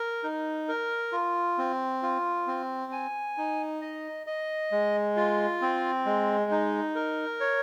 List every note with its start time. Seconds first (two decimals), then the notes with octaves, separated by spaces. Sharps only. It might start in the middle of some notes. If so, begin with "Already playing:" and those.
Already playing: A#4
0.24 D#4
0.68 A#4
1.12 F4
1.58 C4
2.02 F4
2.47 C4
2.92 G#5
3.38 D#4
3.81 D#5
4.27 D#5
4.72 G#3
5.16 F4
5.62 C4
6.06 G#3
6.51 D#4
6.95 A#4
7.40 C#5